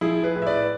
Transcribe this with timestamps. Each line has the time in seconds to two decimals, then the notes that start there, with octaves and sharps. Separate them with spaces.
0.01 F3 E4 G#4
0.24 G#4 B4
0.36 A2
0.42 E5
0.47 B4 D5